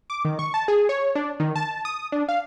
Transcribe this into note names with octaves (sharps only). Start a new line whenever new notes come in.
D6
D#3
C#6
A5
G#4
C#5
D4
D#3
A5
D#6
D4
F5